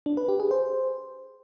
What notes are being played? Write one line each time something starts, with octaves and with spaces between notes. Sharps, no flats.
D4
B4
G4
G#4
C5